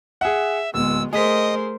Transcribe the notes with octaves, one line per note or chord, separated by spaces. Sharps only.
G#4 E5 F#5
D1 G#3 B3 E6
A3 G#4 A#4 C5 D#5 B6